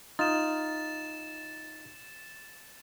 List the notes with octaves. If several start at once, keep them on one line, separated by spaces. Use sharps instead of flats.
D#4 F4 A6 E7